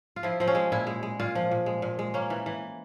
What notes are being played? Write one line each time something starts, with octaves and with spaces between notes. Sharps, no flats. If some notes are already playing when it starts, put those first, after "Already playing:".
F4
F3 E4
F3 C4
C#4
G#3
A#2 E4
G#3
G#3
A#2 F4
F3
A#2
G#3
A#2
G#3
A#3 C#4
E3
E3